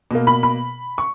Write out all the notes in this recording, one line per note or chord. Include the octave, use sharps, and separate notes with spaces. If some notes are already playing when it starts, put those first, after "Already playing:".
B2 A#3
B5
B5
C#6